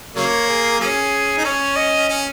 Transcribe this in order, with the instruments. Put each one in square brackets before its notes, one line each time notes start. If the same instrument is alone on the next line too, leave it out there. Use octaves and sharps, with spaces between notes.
[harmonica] C#3 F#3 A#3 [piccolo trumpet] C#5
[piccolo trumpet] G#4
[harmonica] F#3 A#3 C#4 [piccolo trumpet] G#4
[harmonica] D#4
[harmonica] C#4 [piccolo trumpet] C#5
[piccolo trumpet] D#5
[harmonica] C#4